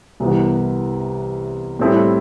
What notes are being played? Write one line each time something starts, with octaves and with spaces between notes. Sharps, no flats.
C2 C3 E3 B3
A2 G3 C4 E4 A4